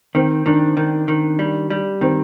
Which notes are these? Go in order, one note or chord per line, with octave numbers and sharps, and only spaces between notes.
D#3 C4
D#3 D4
D#3
D#3
G3
G3
D#3 C4